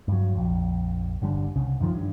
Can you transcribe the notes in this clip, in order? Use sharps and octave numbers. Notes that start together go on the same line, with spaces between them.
G2 F#3
A#1 F2
G1 D3 G3
C2 C#3
F#2 D#3 F3
G2